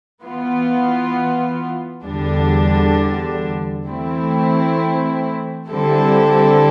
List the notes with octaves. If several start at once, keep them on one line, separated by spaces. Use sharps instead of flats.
E3 B3 F4
E2 D3 G3 D4
E3 A3 C4 E4
D3 G3 C4 E4 A4